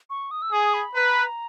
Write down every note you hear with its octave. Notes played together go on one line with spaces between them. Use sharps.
C#6
D#6
E6
G#4 D#6
B5
B4 A#5